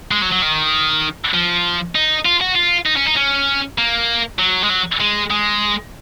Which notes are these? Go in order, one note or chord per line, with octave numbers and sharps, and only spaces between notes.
G#3
F#3
F#3
D#3
F3
D#4
F4
F#4
F4
D#4
C#4
D#4
C#4
A#3
F#3
G#3
F#3
G#3
G#3